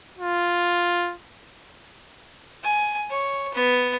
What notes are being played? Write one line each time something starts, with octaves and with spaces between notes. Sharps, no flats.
F4
G#5
C#5
B3